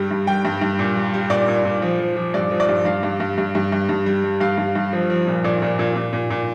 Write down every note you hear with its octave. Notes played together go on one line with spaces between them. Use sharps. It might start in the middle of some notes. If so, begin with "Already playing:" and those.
Already playing: G2 G3
G2
G3 G5
G2
G2
A#2
G3
G3
A#2 D5
A#2
A#2
F3
F3
F3
G2 D5
F3
D5
G2
G2 F5
G2
G2
G2
G2
G2
G2
G3
G3
G2 F5
G2
G2
F3
F3
A#2
A#2 D5
A#2
A#2
A#2
A#2
A#2